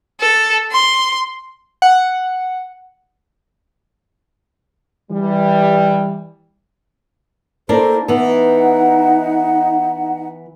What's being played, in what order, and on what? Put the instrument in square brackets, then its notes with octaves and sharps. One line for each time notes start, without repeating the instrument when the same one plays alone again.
[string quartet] A4
C6
[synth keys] F#5
[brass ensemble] E3 G3
[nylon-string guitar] A#3 D4 A#4 [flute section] E4 A4 C5
[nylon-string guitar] E3 B3 [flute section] D#4 F#5